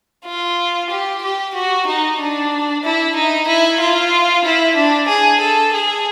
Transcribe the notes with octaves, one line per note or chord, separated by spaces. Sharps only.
F4
G4
G4
F#4
D#4
D4
E4
D#4
E4
F4
E4
D4
G#4
A4
G#4